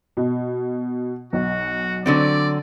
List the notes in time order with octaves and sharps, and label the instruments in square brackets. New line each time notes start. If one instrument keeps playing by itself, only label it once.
[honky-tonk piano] B2
[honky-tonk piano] B1 [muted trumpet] F#4
[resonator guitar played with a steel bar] D3 F#3 C4 [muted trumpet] D5